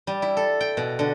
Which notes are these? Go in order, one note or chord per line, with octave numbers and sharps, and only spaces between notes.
G3
E4
A4
G5
B2
D3